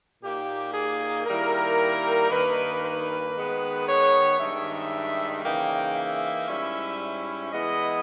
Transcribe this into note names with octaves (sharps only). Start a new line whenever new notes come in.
A#2 A#3 D#4 G4
G#4
D#3 G3 A#3 E4 A#4
G2 D#3 A#3 D#4 B4
B4
D#3 G#3 B3
C#5
G2 D#3 G#3 D#4 E5
C#3 E3 A#3 D#4 G5
E5
G#2 G3 C#4 E4
E3 G#3 B3 E4 D#5